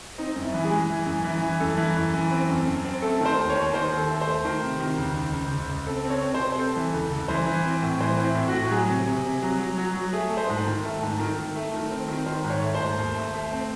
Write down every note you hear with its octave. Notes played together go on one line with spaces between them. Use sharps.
C4 D#4
F#2
E4
E3
G#4
G#3
E3
F#2
E3
E3
F#2 A4
E3
F#2
E3
C4
F#2
F#2
C4
A3 A4
D#3
C5
D#2
C#5
D#2
D#3 C5
D#2
A4
A3
A3 C5
D#3
C3
D#3
C#2
C#2
C#2
C#2
C#2
C4 A4
C4
C#5
C4
C5
C3
C5
C4 A4
E3
C#2 A4
C#2
E3 C5
E3
C4
A2
E3 C5
C4
E4
A2
A2 F#4
F#3 G#4
C3
C3
C3
F#3
F#3
F#3
F#3
A3 G#4
A3
C5
G#2
D#3
A3 A4
G#2
D#3
D#3
A3
D#3
C4
D#3
D#3 C5
G#2
C#5
A3
G#2 C5
D#2
A3
A3
C4